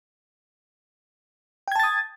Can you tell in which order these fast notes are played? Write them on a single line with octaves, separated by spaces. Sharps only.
G5 G#6 A5 A6 D#6